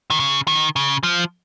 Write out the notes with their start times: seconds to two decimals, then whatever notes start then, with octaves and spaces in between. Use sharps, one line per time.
0.10 D#3
0.20 C#3
0.47 D#3
0.76 C#3
1.03 F3